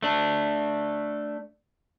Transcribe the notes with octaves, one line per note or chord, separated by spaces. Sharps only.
A3 D4